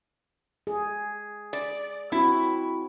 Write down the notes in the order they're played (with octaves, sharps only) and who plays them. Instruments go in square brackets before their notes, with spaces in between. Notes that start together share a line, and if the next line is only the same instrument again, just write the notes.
[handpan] G#4
[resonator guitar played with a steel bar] D5
[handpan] C4 F#4 [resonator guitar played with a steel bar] E4